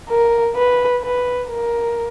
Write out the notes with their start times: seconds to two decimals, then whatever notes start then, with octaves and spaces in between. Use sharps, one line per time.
0.10 A#4
0.56 B4
1.02 B4
1.48 A#4